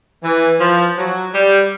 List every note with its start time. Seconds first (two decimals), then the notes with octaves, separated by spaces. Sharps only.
0.22 E3
0.59 F3
0.97 F#3
1.33 G3